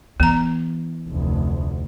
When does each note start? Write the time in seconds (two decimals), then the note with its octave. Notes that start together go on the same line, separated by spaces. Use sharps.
0.20 E3 B3 A#5
1.09 F1 D2